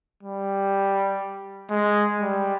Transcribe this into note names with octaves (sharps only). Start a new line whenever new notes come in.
G3
G#3
G3